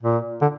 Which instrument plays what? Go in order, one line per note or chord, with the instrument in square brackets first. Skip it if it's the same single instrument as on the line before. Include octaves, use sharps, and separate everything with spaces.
[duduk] A#2
D3